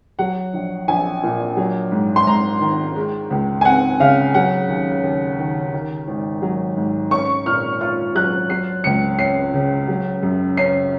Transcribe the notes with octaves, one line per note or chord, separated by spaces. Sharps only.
F#3 F#5
A#1
A#1 G#5
A#2
F#3
G#2
C6
G#2 A#5
D#3
G#3
C#2
G#5
C4 F#5
C#3 F5
F#3 F#5
D#2
D#2
D#3
D#3
G#1
F#3
G#2
C#4 C#6
A#2 F6
F4 F6
F#3 F#6
F#3 C7
C#2 C#7
C#4 C7
C#3
F#3
F#2
C#4 C7